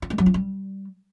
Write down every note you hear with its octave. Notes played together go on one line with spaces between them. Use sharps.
F4
G#3
F#3
F4
G3